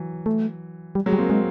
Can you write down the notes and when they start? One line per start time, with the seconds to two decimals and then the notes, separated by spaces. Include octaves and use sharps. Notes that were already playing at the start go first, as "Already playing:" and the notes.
Already playing: E3 F#3
0.26 A3
0.95 G3
1.06 F#3 G#3
1.13 G3
1.18 A#3 C4
1.29 G#3 A#3 C4